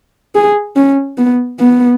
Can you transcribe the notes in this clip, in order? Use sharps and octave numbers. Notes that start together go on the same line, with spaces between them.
G#4
C#4
B3
B3